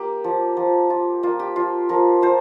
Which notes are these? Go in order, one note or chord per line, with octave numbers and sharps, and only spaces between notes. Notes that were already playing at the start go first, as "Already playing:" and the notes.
Already playing: A#3 G4
F3
F3
F4
A#3 F4
G4
F3 F4
F3 A#4
F4 C5